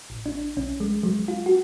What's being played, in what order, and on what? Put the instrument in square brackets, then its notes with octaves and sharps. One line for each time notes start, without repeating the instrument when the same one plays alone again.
[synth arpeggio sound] A1
D4
B1 C#4
G#3
F#3 G#3
F4
F#4